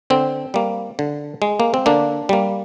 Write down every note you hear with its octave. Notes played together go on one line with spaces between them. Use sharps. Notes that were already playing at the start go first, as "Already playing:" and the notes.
D3 C4
G3 A#3
D3
G#3
A#3
C4
D3 A#3 D4
G3 A#3